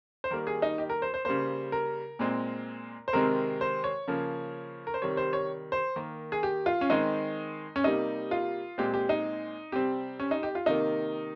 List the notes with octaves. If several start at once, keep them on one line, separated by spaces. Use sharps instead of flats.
C5
D#3 G3 A#3 A#4
G#4
D#4
G4
A#4
C5
C5
C#3 G3 A#3 C5
A#4
A#2 G#3 C4
C5
C3 D#3 G#3 C4 A#4
C5
C#5
C#3 F3 A#3
A#4
C5
C3 D#3 G3 C#5
C5
C#5
C5
D#3 A#3
G#4
G4
F4
C#4
D#3 G#3 C4 D#4
C#4
C3 G3 A#3 D#4
F4
A#2 G#3 C4 G4
G4
D#4
C3 G3 C4 G4
C#4
D#4
G4
F4
C3 D#3 A#3 D#4